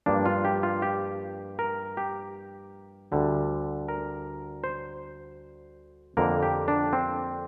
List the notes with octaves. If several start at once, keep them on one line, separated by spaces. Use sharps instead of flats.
G2 F3 A#3 D4
F4
G4
F4
G4
A#4
G4
D2 D3 G3
A#4
C5
F2 D3 A#3 A#4
G4
D4
C4